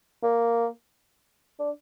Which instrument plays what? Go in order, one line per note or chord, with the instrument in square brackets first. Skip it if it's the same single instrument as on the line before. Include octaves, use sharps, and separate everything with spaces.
[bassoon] A#3
D4